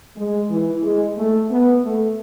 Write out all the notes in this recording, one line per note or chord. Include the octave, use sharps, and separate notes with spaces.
G#3
E3
G#3
A3
B3
A3